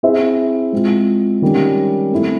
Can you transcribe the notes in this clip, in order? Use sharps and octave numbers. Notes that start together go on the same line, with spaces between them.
C4 E4 G#4 C5 E5
G#3 C4 F4
D#3 G3 A#3 C#4
A3 C4 E4